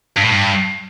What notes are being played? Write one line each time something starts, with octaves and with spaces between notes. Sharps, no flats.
G2
A2
G2